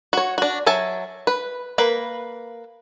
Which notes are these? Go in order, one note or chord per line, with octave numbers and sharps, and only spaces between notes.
F#4 C#5
D4 F#4
F#3 E5 G#5 A5
B4
A#3 B4 B5